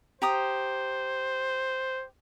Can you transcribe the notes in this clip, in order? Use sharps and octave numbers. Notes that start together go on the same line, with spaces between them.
G4 C5 A#5 D#6